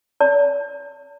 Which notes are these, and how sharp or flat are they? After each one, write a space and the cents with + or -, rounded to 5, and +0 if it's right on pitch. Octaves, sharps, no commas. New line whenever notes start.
D5 -45 A5 +40